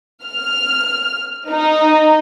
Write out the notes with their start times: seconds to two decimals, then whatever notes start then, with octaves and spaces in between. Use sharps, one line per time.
0.24 F6
1.50 D#4